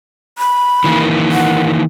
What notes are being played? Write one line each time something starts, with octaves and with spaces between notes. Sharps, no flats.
B5
D#3 E3 A#3
F#5